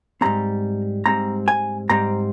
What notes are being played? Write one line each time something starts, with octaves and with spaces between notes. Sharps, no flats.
G#2 G3 C4 A#5
G#2 G3 C4 A#5
G#5
G#2 G3 C4 A#5